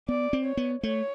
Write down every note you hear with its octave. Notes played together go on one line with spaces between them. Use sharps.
B3 D5
C4
C#5
B3
A3 C#5